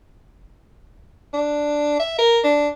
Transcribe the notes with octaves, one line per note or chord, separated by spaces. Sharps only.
D4
E5
A#4
D4